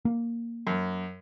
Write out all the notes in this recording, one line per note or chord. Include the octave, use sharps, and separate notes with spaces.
A#3
F#2